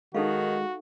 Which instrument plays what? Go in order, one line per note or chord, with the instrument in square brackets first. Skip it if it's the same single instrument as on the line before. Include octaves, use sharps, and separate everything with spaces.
[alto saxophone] D#3 [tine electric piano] G#3 G#4 [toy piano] D#4 A4 F5 [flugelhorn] F#4